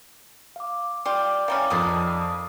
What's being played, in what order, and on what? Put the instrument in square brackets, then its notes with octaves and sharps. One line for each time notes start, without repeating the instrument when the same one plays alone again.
[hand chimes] F5 D6
[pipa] F4 G4 [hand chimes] D5 D6
[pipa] E3 G3 C#4 [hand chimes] F5 A#5 D6
[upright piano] F2 D#6 [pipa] D#3 F3 D4